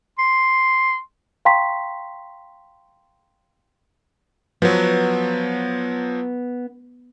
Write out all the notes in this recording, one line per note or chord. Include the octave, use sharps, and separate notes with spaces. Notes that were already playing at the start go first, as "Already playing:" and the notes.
C6
F5 G5 A#5 C6 C#6 B6
F3 F#3 B3